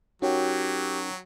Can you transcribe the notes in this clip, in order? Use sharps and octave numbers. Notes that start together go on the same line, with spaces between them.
F#3 C#4 D#4 F#4 G4 A#4 C#5 G5